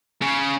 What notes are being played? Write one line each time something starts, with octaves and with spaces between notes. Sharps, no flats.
C#3